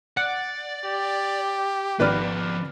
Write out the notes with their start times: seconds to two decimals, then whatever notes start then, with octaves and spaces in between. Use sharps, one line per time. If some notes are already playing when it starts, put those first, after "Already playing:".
0.17 D5 F#5
0.85 G4
2.00 G#1 F3 B3 B4 D5 F6